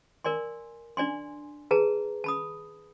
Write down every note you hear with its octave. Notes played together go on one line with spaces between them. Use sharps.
A#4 D5 G#5 C6
D4 D5 G#5 C6
G#4 B4 A5 A#5
A5 B5 D#6